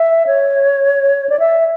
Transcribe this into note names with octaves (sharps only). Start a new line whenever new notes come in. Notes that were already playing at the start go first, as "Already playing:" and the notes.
Already playing: E5
C#5
D5
E5